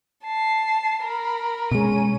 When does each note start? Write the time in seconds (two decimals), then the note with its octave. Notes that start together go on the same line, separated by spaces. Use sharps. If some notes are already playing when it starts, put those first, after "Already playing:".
0.24 A5 C7
1.03 A#4 B5
1.71 B2 G#3 C#4 D#7